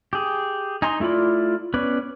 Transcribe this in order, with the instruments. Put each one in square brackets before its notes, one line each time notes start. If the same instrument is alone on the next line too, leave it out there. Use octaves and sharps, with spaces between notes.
[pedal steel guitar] G4 G#4
D#4 G#5 A#5 C6
A3 E4 F4 D5 B5
B3 C#4 B4 C#5 D5